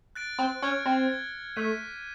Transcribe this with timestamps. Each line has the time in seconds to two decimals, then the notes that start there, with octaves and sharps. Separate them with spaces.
0.15 F#6 A6 D7
0.39 C4
0.62 C#4 F6 G#6 C#7
0.86 C4
1.09 A6 D7 G7
1.56 A3 D6 G6 B6 D#7